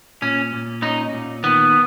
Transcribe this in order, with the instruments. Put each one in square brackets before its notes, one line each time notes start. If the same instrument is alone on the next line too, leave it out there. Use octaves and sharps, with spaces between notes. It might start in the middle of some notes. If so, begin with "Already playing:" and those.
[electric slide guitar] A#2 [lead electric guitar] C#4
[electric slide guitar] A#2
[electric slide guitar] C#4 [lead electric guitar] D#4
[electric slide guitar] A#2
[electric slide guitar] D#3 [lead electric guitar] B3